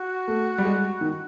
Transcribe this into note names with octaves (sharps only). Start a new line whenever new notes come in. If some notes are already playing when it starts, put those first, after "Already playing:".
Already playing: F#4
A3
G3
G#3
D#3